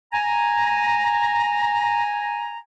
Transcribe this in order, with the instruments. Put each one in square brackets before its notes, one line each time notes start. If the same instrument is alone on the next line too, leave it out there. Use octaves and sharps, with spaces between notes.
[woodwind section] G#5 A#5